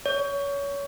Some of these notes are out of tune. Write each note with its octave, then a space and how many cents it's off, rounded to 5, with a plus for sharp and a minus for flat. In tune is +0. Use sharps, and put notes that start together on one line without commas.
C#5 +25